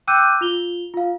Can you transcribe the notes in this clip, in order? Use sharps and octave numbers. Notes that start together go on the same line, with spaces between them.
G5 D6 E6 F#6 G6 D#7
F4 F7 G7
F4 F5